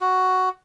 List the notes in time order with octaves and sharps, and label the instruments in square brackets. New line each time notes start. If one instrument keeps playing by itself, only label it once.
[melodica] F#4